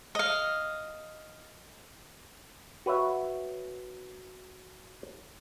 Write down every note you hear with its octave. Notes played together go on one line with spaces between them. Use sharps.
D#5 F5
F#4 B4 C#5 E5